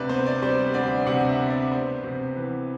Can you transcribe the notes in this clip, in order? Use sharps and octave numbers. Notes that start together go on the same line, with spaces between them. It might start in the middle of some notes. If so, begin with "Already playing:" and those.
Already playing: D2 C3 B4 D5 E5
B3 C5
D5
G3 C5
D2 D5
C3 F#5
E5
B3
D5
B3 C5
C3
E3 B4